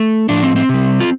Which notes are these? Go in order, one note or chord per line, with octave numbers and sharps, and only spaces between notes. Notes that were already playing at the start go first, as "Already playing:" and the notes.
Already playing: A3
A2 F3 D4
C4
C4
C3 G3
F4